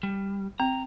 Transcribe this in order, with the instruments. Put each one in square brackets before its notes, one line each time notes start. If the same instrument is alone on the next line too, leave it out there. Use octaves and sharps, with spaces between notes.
[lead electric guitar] G3
[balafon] C4 [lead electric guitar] A#5